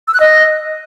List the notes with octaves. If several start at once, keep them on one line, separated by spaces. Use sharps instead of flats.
E6
F#6
D#5